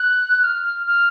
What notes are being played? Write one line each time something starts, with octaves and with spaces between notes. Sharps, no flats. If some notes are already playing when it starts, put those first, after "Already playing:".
Already playing: F#6
F6
F6